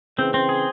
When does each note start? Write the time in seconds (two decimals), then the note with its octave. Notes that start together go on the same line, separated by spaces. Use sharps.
0.18 C#3 E3 C4
0.34 C4
0.49 G#4